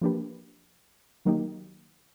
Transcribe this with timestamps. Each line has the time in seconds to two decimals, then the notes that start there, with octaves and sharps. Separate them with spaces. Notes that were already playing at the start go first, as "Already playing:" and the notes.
0.01 F3 A#3 D4 G4 B4
1.25 D#3 F#3 A#3 D#4 G4